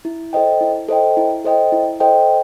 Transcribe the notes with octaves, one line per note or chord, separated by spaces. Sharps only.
E4
A4 C5 D#5 G5
E4
A4 C5 D#5 G5
E4
A4 C5 D#5 G5
E4
A4 C5 D#5 G5